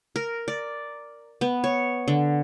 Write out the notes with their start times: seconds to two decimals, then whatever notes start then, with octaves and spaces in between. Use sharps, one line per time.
0.16 A#4
0.48 D5
1.41 B3
1.64 C#5
2.08 D3